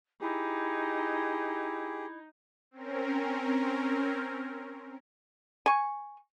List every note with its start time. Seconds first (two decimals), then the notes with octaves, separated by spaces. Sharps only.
0.21 D#4 E4 G4 G#4
2.71 C4 C#4 A#4
5.66 G#5 C#6